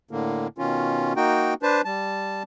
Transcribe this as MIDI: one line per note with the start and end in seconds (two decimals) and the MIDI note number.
0.11 0.47 45
0.11 0.47 50
0.11 0.47 58
0.58 1.13 47
0.58 1.13 51
0.58 1.13 61
0.58 1.13 65
1.16 1.54 58
1.16 1.54 63
1.16 1.54 66
1.16 1.54 79
1.63 1.81 62
1.63 1.81 71
1.63 1.81 72
1.63 1.81 81
1.85 2.43 55
1.85 2.43 81